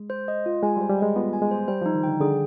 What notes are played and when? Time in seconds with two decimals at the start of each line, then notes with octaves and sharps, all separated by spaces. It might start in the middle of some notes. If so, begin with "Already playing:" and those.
Already playing: G#3
0.10 C5
0.28 D#5
0.46 F4
0.63 G#3 G#5
0.77 G3
0.81 C5
0.90 G3
0.98 G#3 D#5
1.16 B3 F4
1.33 G#5
1.42 G#3
1.51 C5
1.68 G3 C5
1.82 F3 D#4
1.95 D#3
2.03 D3 G5
2.21 D3 G#4